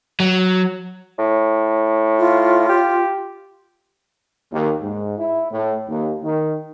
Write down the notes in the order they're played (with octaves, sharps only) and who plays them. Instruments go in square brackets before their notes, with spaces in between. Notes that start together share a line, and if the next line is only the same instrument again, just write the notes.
[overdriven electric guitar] F#3
[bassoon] A2
[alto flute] F4
[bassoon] G4
[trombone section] D#2
G#2
E4
A2
D#2
D#3